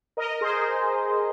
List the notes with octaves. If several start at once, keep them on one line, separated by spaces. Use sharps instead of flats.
A#4 D#5
G#4 C5